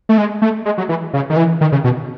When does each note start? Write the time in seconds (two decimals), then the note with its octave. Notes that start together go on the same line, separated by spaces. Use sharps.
0.09 A3
0.18 G#3
0.42 A3
0.65 G#3
0.78 F#3
0.89 E3
1.13 C#3
1.30 D#3
1.36 E3
1.61 D#3
1.72 C#3
1.84 B2